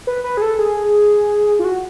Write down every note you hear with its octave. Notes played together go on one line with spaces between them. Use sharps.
B4
B4
G#4
A4
G#4
F4
F#4